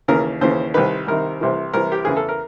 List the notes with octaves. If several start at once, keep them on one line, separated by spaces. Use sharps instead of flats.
D#2 C#3 E3 A#4
D#2 C#3 E3 C5
C2 C3 D#3 B4
C2 C3 D#3 A#4
C2 C3 E3
C2 C3 E3 A#4
G4
E2 C#3 E3 G#4
A4
A#4